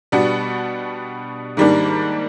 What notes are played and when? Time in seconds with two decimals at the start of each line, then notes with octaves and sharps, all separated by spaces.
0.12 B2 G3 B3 D4 F#4
1.57 G#2 D#3 G3 A#3 D4